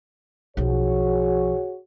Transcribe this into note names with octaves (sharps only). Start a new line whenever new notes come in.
B1 F3 F#4 G#4 C#5